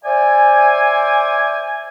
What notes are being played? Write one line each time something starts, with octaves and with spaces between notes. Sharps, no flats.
C5 D5 E5 G#5